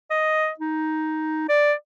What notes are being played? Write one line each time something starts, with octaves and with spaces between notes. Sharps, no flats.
D#5
D#4
D5